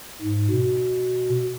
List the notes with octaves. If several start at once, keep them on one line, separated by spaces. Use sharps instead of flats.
G#2
B2